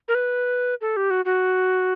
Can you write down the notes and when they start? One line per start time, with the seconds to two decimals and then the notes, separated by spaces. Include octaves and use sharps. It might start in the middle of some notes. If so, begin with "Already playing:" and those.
0.08 A#4
0.15 B4
0.81 A4
0.97 G4
1.10 F#4
1.25 F#4